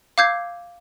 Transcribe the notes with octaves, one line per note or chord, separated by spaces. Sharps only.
F5 D6 E6 G6 G#6 C7